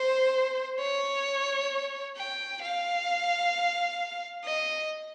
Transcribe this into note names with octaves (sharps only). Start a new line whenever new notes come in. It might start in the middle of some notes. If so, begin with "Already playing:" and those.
Already playing: C5
C#5
G5
F5
D#5